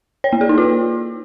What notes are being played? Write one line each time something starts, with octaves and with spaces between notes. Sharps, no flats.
C#5
A#3
G#4
D#4
F4